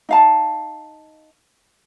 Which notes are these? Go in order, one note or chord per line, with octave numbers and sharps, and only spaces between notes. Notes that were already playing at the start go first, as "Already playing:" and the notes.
D#4 F5 A5